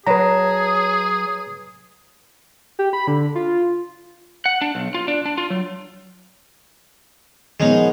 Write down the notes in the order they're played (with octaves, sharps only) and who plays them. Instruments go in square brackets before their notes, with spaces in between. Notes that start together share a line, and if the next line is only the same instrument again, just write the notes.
[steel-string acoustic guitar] F#3 A5 [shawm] G#4 [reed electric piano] B4 A#5
[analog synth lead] G4
B5
D3
F4
[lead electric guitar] F#5
D4
B1
F4
D4
D4
F4
F#3
[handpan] D#3 F3 B3 [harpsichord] G#3 C#4 D#4